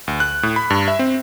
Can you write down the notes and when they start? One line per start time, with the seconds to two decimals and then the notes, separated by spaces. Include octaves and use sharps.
0.08 D2
0.20 F#6
0.43 A2
0.56 B5
0.70 G2
0.88 E5
0.99 C4